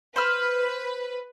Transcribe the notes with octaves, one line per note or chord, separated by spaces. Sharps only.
B4 C5 B5 F6